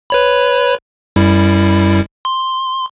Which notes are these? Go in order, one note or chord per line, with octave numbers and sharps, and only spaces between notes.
B4 C#5 B5
F#2 G3 E4
C6